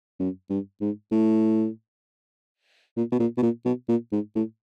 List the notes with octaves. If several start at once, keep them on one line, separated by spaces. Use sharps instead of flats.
F#2
G2
G#2
A2
A#2
B2
A#2
B2
A#2
B2
A#2
G#2
A2